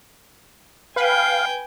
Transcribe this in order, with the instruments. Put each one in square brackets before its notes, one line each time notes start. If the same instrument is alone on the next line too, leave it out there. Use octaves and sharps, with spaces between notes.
[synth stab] B4 [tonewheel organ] F5 [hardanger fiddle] G5 G#5